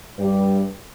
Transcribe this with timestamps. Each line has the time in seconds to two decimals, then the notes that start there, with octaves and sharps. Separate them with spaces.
0.18 G2 G3